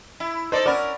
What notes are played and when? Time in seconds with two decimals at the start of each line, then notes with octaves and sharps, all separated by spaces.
0.20 E4
0.52 D#4 A4 C5 D5
0.66 C#4 A#4 D5 F#5 B5